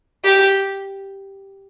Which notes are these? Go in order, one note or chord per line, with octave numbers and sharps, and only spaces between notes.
G4